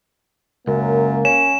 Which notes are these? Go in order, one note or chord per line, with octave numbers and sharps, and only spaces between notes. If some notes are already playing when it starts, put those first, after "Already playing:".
C#2 F#2 A#3
C#4 E7